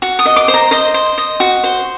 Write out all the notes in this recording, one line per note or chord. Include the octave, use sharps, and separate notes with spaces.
F#4
D#6
D#5
D6
C5
A#5
C5 D#5
C5
D#5
F#4
C5